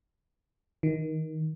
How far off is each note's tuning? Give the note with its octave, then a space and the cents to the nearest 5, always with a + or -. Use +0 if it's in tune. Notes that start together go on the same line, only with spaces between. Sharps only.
D#3 +20